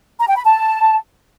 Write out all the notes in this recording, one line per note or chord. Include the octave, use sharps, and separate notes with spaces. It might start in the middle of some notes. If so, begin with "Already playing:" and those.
A#5
G5
B5
A5